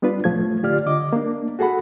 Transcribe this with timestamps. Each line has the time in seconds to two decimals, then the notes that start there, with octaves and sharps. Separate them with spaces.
0.02 G3 B3 D4 F4 B4
0.24 C2 A2 F3 A3 G#6
0.63 D3 F4 G4 D5 F6
0.87 D3 D#5 D6
1.13 A#3 D4
1.59 F#4 G#4 A4 F#5 B5